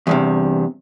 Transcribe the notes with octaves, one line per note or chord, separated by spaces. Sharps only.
E2 G2 C3